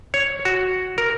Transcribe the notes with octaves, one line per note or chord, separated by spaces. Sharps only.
C#5
F#4
A#4